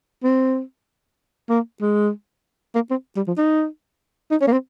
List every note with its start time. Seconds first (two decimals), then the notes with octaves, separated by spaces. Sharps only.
0.23 C4
1.49 A#3
1.81 G#3
2.75 A#3
2.90 C4
3.16 G3
3.27 F3
3.37 D#4
4.31 D#4
4.41 C#4
4.47 A#3
4.52 C4